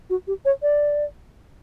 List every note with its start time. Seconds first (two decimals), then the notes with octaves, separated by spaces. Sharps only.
0.10 F#4
0.27 G4
0.45 C#5
0.62 D5